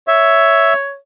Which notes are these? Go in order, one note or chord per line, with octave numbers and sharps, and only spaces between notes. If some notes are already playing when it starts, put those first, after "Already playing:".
C#5 E5